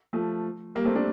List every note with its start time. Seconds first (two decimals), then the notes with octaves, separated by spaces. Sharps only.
0.13 F3 A3
0.75 G3 A#3
0.85 A3 C4
0.95 A#3 D4